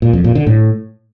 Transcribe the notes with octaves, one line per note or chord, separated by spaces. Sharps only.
A#2
F2
A#2
D3
A2